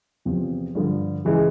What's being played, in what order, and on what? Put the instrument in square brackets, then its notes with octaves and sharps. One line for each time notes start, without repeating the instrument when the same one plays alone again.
[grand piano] E2 C3 F3
G2 D3 F3
C#3 E3 G#3